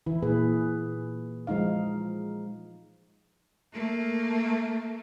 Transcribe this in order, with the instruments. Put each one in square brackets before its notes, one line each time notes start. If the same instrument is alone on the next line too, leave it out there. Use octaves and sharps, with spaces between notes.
[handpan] E3 E4
A#2 G#4 B4
F3 G#3 D#4 F5
[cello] A3 A#3